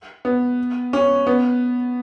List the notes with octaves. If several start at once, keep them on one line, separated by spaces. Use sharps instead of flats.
B3
C#4
B3